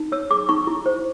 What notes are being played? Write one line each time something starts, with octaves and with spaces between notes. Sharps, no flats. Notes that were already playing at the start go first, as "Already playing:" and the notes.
Already playing: D#4
C#5 E6
G#4 D6
D#4 C#6
E4
C5